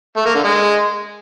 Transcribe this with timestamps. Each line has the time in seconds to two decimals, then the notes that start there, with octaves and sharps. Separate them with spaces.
0.17 A3
0.26 A#3
0.35 D3
0.44 G#3